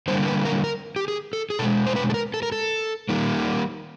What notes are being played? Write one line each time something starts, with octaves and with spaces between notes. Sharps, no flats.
D3 G3 A#3 C5
B4
A#4
A#4
G4
G#4
A4
G#4
B2 G#3 A4
C5
B4
A4
A#4
A4
A#4
A4
D#3 G3 A#3